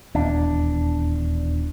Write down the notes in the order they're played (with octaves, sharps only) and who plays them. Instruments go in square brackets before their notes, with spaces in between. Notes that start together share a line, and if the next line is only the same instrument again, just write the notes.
[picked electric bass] D#1 E2 [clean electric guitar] D4